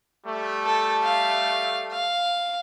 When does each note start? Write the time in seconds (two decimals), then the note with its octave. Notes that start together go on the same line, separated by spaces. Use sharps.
0.25 G3 A3
0.66 A4
1.03 F5
1.92 F5